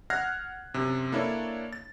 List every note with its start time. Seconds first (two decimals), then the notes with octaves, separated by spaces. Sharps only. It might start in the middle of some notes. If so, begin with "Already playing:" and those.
0.10 F#5 F6 F#6 G#6 A#6 C7
0.74 F#2 C3
1.12 A#3 D4 E4 A4 C#5
1.73 A6